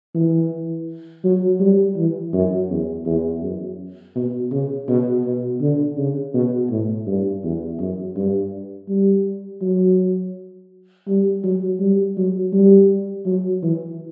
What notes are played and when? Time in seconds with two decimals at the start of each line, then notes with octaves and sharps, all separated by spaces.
0.15 E3
1.24 F#3
1.60 G3
1.97 E3
2.33 F#2
2.69 E2
3.06 E2
3.43 F#2
4.16 B2
4.52 C#3
4.88 B2
5.25 B2
5.61 D3
5.97 C#3
6.34 B2
6.70 A2
7.07 G2
7.44 E2
7.79 F#2
8.16 G2
8.89 G3
9.62 F#3
11.07 G3
11.44 F#3
11.80 G3
12.17 F#3
12.53 G3
13.26 F#3
13.63 E3